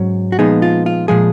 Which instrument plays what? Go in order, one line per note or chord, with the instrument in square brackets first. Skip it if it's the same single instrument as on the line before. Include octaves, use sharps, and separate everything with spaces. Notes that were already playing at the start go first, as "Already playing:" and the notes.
Already playing: [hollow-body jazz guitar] G#2 F#3 C#4
F#4
A#2 F3 G#3 B3 D#4 G#4
F4
F4
A#2 F3 G#3 G#4